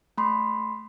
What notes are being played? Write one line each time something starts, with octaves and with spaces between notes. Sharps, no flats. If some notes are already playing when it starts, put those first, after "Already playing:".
A3 B5 C6